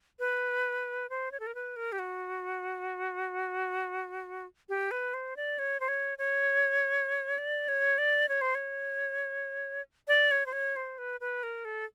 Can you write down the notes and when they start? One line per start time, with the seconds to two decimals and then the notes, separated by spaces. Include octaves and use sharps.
0.19 B4
1.10 C5
1.32 C#5
1.40 A4
1.47 A#4
1.55 B4
1.76 A#4
1.92 G4
1.99 F#4
4.69 G4
4.91 B4
5.14 C5
5.36 D5
5.59 C#5
5.80 C5
5.88 C#5
6.18 C#5
7.38 D5
7.68 C#5
7.98 D5
8.29 C#5
8.41 C5
8.55 C#5
10.08 D5
10.31 C#5
10.46 C5
10.53 C#5
10.76 C5
10.98 B4
11.20 B4
11.43 A#4
11.65 A4